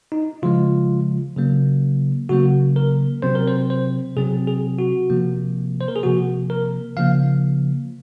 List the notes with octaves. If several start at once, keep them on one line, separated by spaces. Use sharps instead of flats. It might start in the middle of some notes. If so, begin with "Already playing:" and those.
D#4
C#3 F3 G#3 F4
C#3 F#3 A#3
C#3 F#3 A#3 F#4
A#4
C3 F#3 C4 C5
A#4
C5
C5
C3 F#3 C4 G#4
G#4
F#4
C3 F3 A#3
C5
A#4
G#4
C3 F3 A#3 F#4
A#4
C#3 F3 A#3 F5